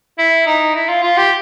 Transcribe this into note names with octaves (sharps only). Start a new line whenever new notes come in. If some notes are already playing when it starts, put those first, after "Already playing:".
E4
D#4
E4
F4
F4
G4